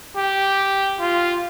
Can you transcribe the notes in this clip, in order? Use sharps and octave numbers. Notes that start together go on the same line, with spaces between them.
G4
F4